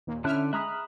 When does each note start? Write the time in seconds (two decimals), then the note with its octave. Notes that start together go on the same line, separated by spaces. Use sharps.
0.07 D#2 A#2
0.24 D3 C#4 E4 E5 A5 F6 F#6
0.53 G#3 E5 A#5 B5 D#6 F6 F#6